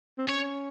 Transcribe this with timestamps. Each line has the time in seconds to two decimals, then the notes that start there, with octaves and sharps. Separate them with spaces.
0.18 C4
0.28 C#4 C#5